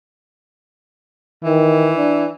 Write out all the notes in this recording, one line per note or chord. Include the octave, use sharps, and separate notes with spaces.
D#3 E3
D4